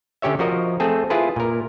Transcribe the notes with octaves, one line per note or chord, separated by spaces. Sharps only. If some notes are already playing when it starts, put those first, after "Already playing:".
D3 C#4 G4 C#5 E5
F3 F#4 A#4 D#5
A3 C4 G#4 A4
E4 F4 G#4 B4
A#2 A#4